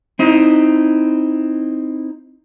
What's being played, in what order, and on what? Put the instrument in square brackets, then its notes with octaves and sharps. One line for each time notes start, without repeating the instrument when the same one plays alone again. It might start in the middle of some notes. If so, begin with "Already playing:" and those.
[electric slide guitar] C4 D#4 E4